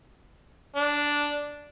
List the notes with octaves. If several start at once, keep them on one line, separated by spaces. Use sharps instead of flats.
D4